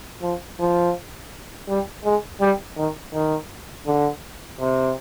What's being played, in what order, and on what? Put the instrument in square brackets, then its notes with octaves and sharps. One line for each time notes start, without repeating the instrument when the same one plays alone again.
[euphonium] F3
F3
G3
G#3
G3
D#3
D#3
D3
C3